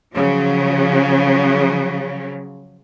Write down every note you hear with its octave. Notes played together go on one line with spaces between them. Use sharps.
C#3 F3 F#3